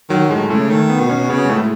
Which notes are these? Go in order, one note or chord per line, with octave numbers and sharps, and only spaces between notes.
D#3 F#3
A2 G#3
C#3 A3
D#3 A3
B3
B2
C#4
C#3 B3
G#3
A2 A3